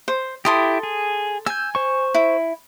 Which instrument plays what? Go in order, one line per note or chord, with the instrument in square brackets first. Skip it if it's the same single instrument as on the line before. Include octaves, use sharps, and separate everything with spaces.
[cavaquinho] C5
[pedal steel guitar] E4 G4 [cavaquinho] A4 C6 D#6
[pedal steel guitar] G#4
[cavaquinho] G#5 [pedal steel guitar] E6 G6
[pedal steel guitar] C5 C#6
[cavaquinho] E4